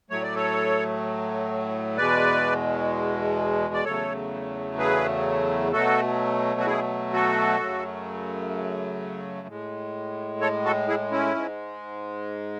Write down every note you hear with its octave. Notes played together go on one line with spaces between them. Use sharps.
A2 F#3 A3 C#5
D5
A4 C#5
E2 B2 G#3 B4 D5
D5
E2 C#3 F#3 A3 A4 C#5
G#4 B4
B2 F#3 A3 F#4 A4
F#4
E4 G#4
F#4 A4
F#2 C#3 F#3 A3
A2 G#3
A4 C#5
F#4 A4
E4 G#4
C#4 E4
G#2 G#3